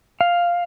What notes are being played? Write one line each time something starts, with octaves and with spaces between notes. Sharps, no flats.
F5